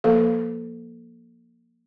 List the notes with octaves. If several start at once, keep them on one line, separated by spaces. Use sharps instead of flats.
F3 A#3 A4 B4 F5